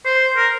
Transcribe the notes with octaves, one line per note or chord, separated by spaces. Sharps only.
C5
A#4